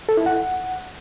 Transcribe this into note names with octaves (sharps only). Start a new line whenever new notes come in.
A4
E4
F#5